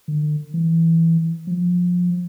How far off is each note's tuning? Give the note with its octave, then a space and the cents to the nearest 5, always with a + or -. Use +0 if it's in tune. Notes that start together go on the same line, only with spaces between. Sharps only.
D3 +40
E3 +0
F3 +25